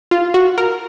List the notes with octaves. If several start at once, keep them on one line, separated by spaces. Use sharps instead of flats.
F4
F#4
A#4